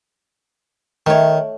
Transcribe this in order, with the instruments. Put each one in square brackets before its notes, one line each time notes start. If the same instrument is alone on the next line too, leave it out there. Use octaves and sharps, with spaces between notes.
[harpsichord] D#3 [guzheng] A3 C#5